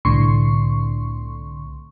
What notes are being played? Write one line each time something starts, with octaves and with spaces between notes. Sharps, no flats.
C2 A2 D3 C6 C#6